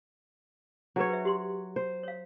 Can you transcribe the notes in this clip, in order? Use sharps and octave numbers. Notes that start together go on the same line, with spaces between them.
F#3 D4 G#4 B4 C#5
B4 C5 E5
G4 C6
C5
C#5 F5